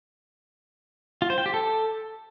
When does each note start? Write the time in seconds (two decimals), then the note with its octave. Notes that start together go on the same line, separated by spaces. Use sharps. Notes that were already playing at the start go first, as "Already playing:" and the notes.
1.22 F4
1.30 C5
1.38 G5
1.46 G4
1.54 A4